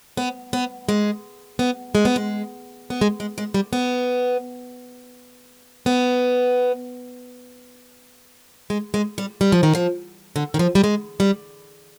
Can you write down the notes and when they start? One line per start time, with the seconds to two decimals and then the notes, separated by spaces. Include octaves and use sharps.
0.17 B3
0.53 B3
0.88 G#3
1.59 B3
1.95 G#3
2.05 B3
2.16 G#3
2.90 B3
3.01 G#3
3.20 G#3
3.38 G#3
3.54 G3
3.73 B3
5.86 B3
8.70 G#3
8.94 G#3
9.18 G3
9.41 G3
9.52 F3
9.63 D#3
9.75 F3
10.36 D3
10.54 D#3
10.59 F3
10.75 G3
10.84 G#3
11.20 G3